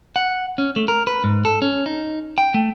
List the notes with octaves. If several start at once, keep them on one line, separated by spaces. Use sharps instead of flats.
F#5
C#4
A3
A#4
B4
G#2
A4
C#4
D#4
G5
A3